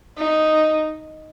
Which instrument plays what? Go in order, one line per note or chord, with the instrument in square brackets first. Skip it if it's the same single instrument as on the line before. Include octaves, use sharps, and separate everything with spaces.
[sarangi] D#4